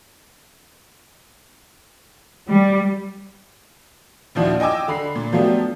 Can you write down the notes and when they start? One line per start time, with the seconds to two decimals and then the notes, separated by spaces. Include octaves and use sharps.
2.47 G3
4.35 A#1 D#2 F3 D4 E4 F#4
4.60 D#5 G5 G#5 D6 E6
4.88 D3 B5 C7
5.15 A#2
5.32 F3 F#3 A3 B3 D4 G4